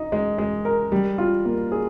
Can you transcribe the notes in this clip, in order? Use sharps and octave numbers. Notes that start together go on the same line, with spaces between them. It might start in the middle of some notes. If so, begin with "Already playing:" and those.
Already playing: D#4
G#3
G#3
A#4
G3
F4
A#3
G#4